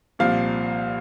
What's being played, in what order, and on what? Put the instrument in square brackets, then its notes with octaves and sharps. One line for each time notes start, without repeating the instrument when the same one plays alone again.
[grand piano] C2 A#2 F3 F5